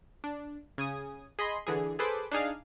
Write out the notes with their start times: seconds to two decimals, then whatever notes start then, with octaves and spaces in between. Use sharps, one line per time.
0.24 D4
0.78 C#3 G#5 D#6
1.39 G#4 D#5 B5 C6
1.67 D3 E3 G#4
1.99 G#4 A4 B4 C5 D6
2.31 D4 D#4 G#4 F5